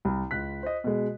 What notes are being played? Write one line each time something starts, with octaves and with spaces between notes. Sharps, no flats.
C2
C#2 F#6 B6
C5 D#5
B2 G#3